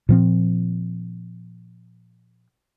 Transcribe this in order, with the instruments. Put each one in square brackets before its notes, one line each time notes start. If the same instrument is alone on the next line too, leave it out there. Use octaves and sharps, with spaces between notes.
[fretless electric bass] A#2 F3 C4